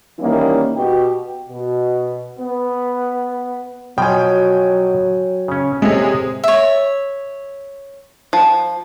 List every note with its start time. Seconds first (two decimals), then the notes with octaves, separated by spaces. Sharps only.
0.19 D#3 E3 G3 A#3 C#4 E4
0.76 B2 G4
1.49 B2
2.39 B3
3.98 B2 F3 F#3 G5 G#5
5.48 C#3 C#4
5.82 C3 G#3 G#4 A4 C#5 E5
6.44 C#5 E5
8.33 F3